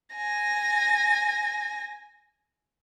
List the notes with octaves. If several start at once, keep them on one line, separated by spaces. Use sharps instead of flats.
G#5 A#6